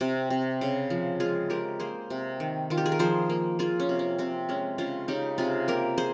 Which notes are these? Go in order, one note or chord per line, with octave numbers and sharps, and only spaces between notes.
C3
C3
C#3
F3
G#3 F4 G#4
G#3 G4 A#4
A#3 G#4 C5
C3
D#3
D#3 F4
G4
G#4
A#4
F3 G#4 C5
A#3
A#3 F4 G#4
C#4
C3
C#4
C3 C4
G#3 C#4
C#3 C#4 F4
C#3 D#4 G4
C3 F4 G#4
A#3 G4 A#4
G#4 C5